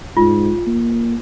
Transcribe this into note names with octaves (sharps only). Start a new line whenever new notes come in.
G#2 F4
A#3